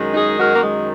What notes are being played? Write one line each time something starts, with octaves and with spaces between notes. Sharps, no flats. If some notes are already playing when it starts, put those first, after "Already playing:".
Already playing: F#2 D#3 G#3
D#4 G#4
F#4 A#4
A#3
G#3